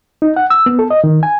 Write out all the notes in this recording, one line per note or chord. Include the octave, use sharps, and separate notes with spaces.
D#4
F#5
E6
B3
A4
D#5
D#3
G#5